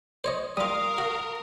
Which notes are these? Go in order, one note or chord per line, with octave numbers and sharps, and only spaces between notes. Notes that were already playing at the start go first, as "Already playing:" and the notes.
C5 C#5 D#5
G3 F4 A#4 F5 D#6
F#4